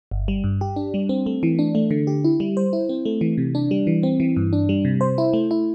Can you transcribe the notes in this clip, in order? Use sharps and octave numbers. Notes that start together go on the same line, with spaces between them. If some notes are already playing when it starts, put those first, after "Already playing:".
G1
G3
G2
G4
D4
G3
C4
A3
E3
D4
A3
D3
G4
E4
G3
C5
E4
C4
A3
E3
C3
D4
G3
E3
C4
E3
G2
D4
G3
C3
C5
E4
A3
E4